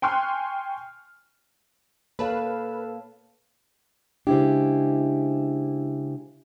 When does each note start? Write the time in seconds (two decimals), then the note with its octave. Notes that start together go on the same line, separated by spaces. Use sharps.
0.02 G5 G#5 C6 C#6 F6 F#6
2.19 A#3 A4 B4 C#5 F5 A5
4.27 C#3 G#3 D4 E4 G4 C5